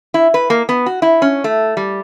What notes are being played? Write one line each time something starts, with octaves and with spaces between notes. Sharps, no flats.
E4
B4
A#3
B3
F#4
E4
C#4
A3
G3